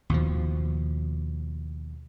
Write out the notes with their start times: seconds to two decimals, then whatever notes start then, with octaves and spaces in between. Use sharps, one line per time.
0.10 D#2 B2 F3